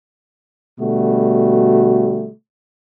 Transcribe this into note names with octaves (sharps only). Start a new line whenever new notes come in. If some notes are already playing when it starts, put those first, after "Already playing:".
B2 D3 G3 A3 F#4